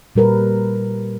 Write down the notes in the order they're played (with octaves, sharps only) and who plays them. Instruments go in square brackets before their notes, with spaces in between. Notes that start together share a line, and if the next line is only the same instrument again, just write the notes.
[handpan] A#2 G3 A#4 B4